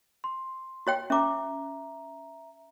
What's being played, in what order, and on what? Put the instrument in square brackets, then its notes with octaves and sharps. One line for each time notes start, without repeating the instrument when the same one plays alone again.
[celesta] C6
[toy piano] F#4 C#5 G5
[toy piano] C#4 D6 [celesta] E5 A#5